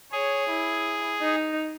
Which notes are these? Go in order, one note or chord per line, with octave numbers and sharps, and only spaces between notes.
G#4 C#5
E4
D#4